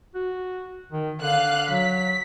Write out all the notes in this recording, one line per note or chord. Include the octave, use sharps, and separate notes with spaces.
F#4
D#3
D3 F5 F#6
F#3 B6